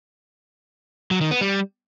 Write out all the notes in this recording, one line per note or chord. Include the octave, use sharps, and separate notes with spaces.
F#3
D#3
B3
G3